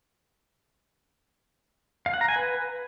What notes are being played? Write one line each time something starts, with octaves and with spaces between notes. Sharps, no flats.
F5
F#5
A#5
G#5
B4